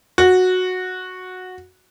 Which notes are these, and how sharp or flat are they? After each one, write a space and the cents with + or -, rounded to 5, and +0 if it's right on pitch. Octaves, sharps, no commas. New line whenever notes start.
F#4 -10